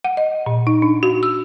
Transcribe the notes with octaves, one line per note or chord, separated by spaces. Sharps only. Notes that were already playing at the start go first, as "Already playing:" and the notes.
F#5
D#5
A#2
D#4
D4
F#4
E6